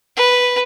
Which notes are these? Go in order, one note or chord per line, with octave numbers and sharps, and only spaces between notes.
B4